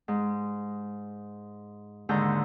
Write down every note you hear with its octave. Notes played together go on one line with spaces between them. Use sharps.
G#2
D#2 G#2 D3 A5 A#5 G6